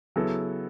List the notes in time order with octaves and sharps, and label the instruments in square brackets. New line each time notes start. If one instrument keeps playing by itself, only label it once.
[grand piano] C#3 F#3 B3 E4 A4